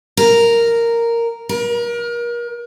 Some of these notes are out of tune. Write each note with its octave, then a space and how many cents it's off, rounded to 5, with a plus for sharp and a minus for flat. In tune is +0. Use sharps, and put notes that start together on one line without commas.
A#4 -5
A#4 +35